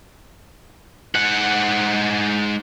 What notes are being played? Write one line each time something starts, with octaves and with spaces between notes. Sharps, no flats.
G#2 F#5